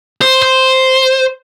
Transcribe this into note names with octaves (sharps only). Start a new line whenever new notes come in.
C5
C5